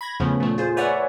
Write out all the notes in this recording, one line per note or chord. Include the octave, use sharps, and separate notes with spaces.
B5 G#6 A#6
E2 C#3 F3 A3 B3 C#4
A#2 F3 A3
F4 G#4 C5
B4 C#5 D5 E5 F#5 G#5